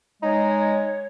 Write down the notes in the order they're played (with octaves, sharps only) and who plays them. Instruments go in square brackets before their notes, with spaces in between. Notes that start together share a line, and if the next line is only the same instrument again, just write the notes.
[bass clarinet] G#3 [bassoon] D#4 [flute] C#5